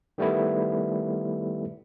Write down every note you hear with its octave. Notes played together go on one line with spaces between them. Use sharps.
D#3 G3 A3 B3 E4